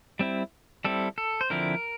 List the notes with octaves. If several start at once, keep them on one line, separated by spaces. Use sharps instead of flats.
G3 C4 E4
G3 C4 E4 A4
A4
C5
D3 F3 C4 E4 A#4